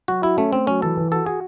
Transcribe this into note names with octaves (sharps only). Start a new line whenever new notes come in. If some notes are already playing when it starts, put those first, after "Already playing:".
F#3 F#4
E4 F#4
A3 C#4
A3 C4
F#3 C#4
E3 A4
E3
F#4 A4
F#4 G#4